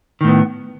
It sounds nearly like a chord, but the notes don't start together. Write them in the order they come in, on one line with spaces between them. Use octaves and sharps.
D#3 A2 B3